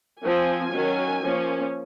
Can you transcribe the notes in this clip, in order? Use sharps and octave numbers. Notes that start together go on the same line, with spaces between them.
F3 C4 G#5
D#3 F#3 C#4
F3 A#3 C#4